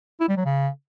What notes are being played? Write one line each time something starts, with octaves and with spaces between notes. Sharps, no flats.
E4
G3
F#3
C#3